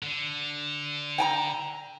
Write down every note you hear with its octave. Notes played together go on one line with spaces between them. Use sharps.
D3
G5 G#5 A#5